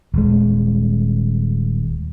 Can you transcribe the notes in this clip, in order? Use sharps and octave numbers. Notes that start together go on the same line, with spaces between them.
D#1 G#3